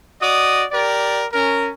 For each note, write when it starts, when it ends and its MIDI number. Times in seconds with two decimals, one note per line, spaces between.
0.21 0.64 66
0.21 0.64 74
0.21 0.64 75
0.21 0.64 87
0.71 1.25 67
0.71 1.25 70
0.71 1.25 74
1.32 1.71 61
1.32 1.71 70